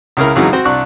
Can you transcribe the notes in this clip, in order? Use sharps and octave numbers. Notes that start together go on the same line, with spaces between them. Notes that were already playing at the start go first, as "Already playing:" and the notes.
C#2 C#3 E4 A#4
F2 C#3 E3 F#3 G#3 D#4
C4 F#4 C5
C2 D4 C#6 F#6